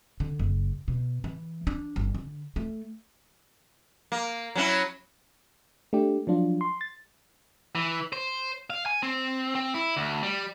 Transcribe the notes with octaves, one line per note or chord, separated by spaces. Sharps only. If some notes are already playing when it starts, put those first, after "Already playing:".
D3
F#1
B2
E3
D4
G1
D3
A3
A#3
F#3 C#4 E4
A3 D4 G4
F3 F#3 D4 F4
C6
A6
E3
C5
F5
G#5
C4
C4
E4
D2
G3